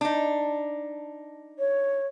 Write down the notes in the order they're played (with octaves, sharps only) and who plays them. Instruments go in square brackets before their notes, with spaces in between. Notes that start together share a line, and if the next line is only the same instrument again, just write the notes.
[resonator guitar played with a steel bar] D4 D#4
[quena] C#5